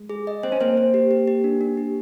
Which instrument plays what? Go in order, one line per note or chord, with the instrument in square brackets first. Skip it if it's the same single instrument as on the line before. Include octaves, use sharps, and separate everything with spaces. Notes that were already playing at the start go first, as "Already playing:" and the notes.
Already playing: [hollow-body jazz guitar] G#3
[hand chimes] G#4
D#5
[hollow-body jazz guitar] C4 [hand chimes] C5
[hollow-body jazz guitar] C#4
[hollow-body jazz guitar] A#3 C4 [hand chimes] C5
[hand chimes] C5
G4
G4
G4
D4
D4
G4